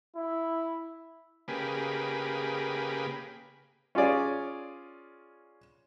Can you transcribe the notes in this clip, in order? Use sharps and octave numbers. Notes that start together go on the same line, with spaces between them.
E4
C#3 A#3 G4 G#4 B4
C#4 F4 G#4 D5